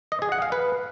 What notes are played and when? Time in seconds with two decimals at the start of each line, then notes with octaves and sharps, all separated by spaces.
0.12 D#5
0.22 G#4
0.32 F#5
0.42 F5
0.52 B4